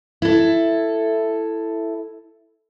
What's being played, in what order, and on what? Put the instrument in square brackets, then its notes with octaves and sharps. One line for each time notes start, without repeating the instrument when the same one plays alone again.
[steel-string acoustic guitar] E4 A4